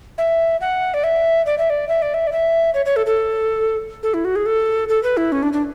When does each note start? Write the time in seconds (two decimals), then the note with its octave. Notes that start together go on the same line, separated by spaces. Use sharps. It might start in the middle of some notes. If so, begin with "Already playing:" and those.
0.18 E5
0.61 F#5
0.94 D5
1.04 E5
1.46 D5
1.58 E5
1.70 D5
1.89 E5
2.02 D5
2.14 E5
2.27 D5
2.32 E5
2.74 C#5
2.86 C#5
2.96 A4
3.06 A4
4.03 A4
4.14 E4
4.25 F#4
4.36 G#4
4.46 A4
4.89 A4
5.03 B4
5.17 E4
5.32 C#4
5.43 D4
5.53 D4